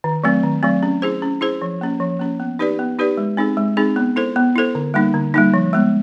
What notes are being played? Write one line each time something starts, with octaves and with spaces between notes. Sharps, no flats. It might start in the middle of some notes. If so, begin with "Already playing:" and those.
D#3
F#3 A3 C4
D#3
F#3 A3 C4
C#4
E4 G#4 C5
C#4
E4 G#4 C5
F3
A#3 C#4
F3
A#3 C#4
B3
D#4 G4 B4 D5
B3
D#4 G4 B4 D5
G#3
C4 D#4 G#4
G#3
C4 D#4 G#4
B3
E4 A4 C5
B3
E4 A4 C5
D3
G3 A#3 D#4
D3
G3 A#3 D#4
F3
G#3 B3